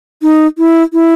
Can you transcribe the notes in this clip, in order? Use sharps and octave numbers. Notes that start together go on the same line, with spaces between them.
D#4
E4
E4